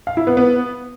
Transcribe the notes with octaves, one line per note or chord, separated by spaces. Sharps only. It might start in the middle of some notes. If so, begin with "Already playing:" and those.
F5
E4
B3
B3